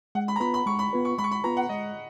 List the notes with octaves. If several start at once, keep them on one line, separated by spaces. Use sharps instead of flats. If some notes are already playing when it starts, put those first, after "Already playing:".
G#3 F#5
B5
A#5
B3 F4 B4 B5
B5
G#3 C#6
B5
B3 F4 B4
C#6
G#3 B5
C#6
B5
B3 F4 B4 A#5
F#5
G#3 D#5